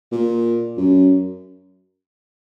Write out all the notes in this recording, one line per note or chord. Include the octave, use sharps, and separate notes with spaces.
A#2
F#2